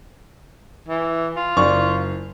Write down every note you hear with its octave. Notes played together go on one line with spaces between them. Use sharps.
E3
F4
F#1 D5 C#6